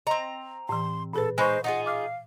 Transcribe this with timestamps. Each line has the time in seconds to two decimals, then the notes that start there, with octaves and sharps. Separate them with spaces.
0.07 C4 D#5 A#5 C6
0.69 A2 E3 C6
1.13 A#2 G#4 A4 B4
1.38 G#3 D#4 C5 G#5 B5 C#6
1.64 D#4 F4 G#4 F#5
1.86 F5 D6 F6